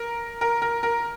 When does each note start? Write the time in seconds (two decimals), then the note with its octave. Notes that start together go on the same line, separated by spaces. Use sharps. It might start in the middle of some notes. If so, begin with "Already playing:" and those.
Already playing: A#4
0.41 A#4
0.62 A#4
0.83 A#4